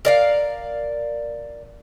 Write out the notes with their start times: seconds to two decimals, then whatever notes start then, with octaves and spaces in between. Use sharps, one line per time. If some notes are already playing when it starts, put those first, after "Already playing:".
0.05 A#4 D5 F5